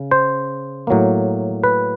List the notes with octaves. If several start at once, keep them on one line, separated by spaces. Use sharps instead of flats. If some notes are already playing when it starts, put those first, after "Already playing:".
Already playing: C#3
C5
A2 F#3 A#3
B4